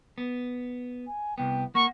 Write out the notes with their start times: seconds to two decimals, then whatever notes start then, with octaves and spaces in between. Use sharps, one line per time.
0.18 B3
1.07 G#5
1.38 C2 B3 G5
1.75 A#3 F#5 C#6